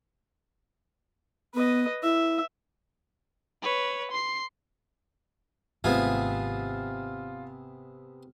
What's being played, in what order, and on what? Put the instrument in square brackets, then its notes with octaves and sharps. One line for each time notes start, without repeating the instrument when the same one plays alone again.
[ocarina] B3 [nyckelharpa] B4 D#5
[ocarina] E4 [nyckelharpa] E5
[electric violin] B4 C#5
C6 C7
[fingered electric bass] G#1 A3 C4 [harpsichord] C3 B3 G#4 [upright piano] F4